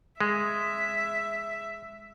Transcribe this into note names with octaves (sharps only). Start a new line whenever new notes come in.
G#3 E5